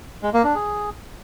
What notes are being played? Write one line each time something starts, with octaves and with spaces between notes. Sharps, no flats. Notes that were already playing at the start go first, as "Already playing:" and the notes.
G#3
A#3
D4
G#4